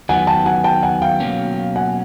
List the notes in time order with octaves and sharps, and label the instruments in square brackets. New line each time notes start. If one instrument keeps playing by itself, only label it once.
[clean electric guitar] D#3 F#3 B3 [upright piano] F#5 G#5
[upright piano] G5 A5
F#5 G#5
G5 A5
F#5 G#5
F5 G5
[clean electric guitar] B2 F#3 A#3 C#4
[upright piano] F#5 G#5